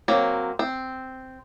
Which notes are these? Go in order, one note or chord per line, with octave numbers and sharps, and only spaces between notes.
F#3 A#3 C4
C4